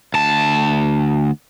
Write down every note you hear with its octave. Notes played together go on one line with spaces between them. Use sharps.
D2 A5